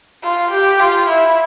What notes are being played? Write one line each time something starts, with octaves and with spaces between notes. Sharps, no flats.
F4
G4
F4
E4